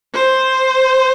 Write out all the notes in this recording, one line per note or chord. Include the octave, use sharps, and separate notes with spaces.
C5